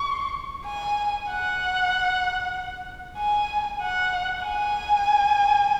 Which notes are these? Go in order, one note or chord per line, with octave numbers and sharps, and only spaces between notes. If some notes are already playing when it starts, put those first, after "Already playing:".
Already playing: C#6
G#5
F#5
G#5
F#5
G#5